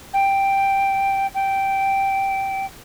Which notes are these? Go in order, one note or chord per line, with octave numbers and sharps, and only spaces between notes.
G5
G5